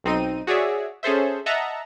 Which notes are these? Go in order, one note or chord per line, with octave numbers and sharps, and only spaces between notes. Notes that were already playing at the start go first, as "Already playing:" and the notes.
B1 C4 D#4 D#7
F#4 G#4 C#5 D5 E5
C#4 G#4 A4 C5 E5
D#5 E5 F#5 A5 A#5